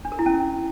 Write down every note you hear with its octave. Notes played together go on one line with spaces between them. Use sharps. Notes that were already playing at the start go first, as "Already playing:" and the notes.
D4
A#4
E4
C#4